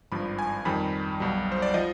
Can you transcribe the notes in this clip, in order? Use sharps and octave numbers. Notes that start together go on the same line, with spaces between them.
G#1 G2 F3 B5
G#5
F2 D#3 G3 B5
B1 B2 G3
C5
D5
F3 D#5